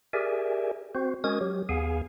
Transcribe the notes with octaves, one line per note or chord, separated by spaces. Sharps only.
G4 G#4 A#4 D5 E5 G#5
C4 F#4 C5
G#3 C#4 F#4 A#4 D#6 G#6
F#3 G4
D#2 B3 G#4 F5 G#5